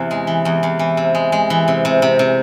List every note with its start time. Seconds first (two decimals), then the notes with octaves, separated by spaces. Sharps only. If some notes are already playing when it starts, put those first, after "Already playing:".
Already playing: E2 C3 E3
0.11 G#3
0.27 E3
0.45 E2
0.63 E2
0.79 E3
0.97 C3
1.15 G#3
1.32 G#3
1.50 E3
1.68 C3
1.85 C3
2.02 C3
2.19 C3